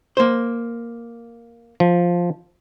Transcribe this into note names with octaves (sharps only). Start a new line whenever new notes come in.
A#3 C5
F3